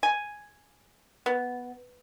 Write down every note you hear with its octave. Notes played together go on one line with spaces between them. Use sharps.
G#5
B3